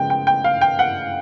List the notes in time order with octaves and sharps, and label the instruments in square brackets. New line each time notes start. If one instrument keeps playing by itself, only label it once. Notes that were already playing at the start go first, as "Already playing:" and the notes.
Already playing: [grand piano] C#3 F3 G#3 B3 G5
G5
G5
F5
G5
F#5